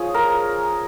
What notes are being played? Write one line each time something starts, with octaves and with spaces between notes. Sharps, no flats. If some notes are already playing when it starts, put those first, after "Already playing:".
Already playing: F3 C#4 G#4
A#4